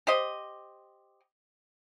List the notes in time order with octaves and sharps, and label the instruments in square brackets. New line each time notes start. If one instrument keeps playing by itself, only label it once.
[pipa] G4 C5 D#5